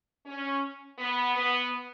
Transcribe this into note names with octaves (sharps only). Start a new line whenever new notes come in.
C#4
B3
B3